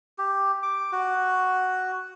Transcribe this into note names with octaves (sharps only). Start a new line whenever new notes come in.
G4
D6
F#4